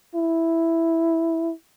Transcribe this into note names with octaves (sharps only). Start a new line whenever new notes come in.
E4